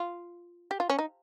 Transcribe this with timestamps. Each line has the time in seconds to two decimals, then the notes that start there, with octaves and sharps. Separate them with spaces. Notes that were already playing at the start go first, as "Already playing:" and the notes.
Already playing: F4
0.71 G4
0.80 F4
0.90 C#4
0.99 D#4